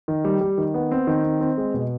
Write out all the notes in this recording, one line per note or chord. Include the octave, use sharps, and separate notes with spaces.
D#3
G3
G3
D#3
B3
C4
D#3
C4
C4
G#3
B2